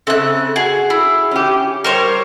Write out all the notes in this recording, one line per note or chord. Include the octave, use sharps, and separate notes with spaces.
C#3 C4 A4 E5 F#6
F#4 G#4
E4
C#4 G4
G3 A#4 C5 C#5